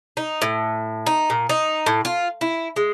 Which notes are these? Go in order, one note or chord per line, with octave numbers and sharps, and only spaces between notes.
D#4
A2
D#4
A#2
D#4
A2
F4
E4
G#3